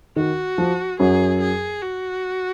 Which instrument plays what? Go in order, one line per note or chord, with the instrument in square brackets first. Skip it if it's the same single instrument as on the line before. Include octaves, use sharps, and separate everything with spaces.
[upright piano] D#3 [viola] F#4
[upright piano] F3
[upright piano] F#2 F#3 [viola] G#4
[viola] G#4
F#4